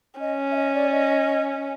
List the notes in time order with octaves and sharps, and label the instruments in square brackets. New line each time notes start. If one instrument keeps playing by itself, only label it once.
[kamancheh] C#4 [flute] D#5
[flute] E5
D#5
D5
D#5